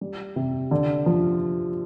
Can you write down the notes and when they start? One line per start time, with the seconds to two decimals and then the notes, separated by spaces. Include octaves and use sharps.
0.01 G3
0.36 C3
0.71 D3
1.06 F3